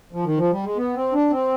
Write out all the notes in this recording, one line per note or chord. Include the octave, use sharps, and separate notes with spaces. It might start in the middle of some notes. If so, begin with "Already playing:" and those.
F3
D#3
F3
G3
G#3
B3
C4
D4
C4